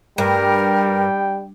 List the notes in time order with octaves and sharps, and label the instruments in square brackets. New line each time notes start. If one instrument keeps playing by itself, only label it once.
[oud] G2 [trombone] G3 [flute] A#4 [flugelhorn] G5